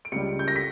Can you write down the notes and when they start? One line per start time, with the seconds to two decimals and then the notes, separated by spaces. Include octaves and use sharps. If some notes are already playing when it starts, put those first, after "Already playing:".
0.05 D7
0.12 C#2 C#3 G3 C#7
0.39 G6
0.48 A#6
0.56 B6